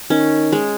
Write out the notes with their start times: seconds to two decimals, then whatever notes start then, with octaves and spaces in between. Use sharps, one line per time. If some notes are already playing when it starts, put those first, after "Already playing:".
0.10 D#3 C#4
0.53 G#3